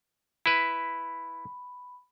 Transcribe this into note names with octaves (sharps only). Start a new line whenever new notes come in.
E4 B4 B5